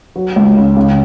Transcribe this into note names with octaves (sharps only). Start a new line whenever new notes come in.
F#3
C#2
C#3
C#3